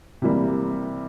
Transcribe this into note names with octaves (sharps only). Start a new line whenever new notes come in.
C3 E3 G3 A#3